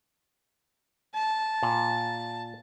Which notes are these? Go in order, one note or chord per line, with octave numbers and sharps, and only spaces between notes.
A5
A#2